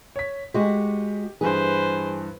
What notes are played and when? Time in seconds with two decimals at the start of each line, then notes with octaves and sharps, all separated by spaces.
0.16 C#5 B6
0.54 G#3 F#4 G4
1.41 G2 E3 G#4 B4 C5